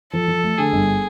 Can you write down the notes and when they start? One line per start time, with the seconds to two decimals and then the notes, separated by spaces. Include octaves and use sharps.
0.13 F3 A4
0.28 F3
0.44 A3
0.58 D3 G#4
0.72 G1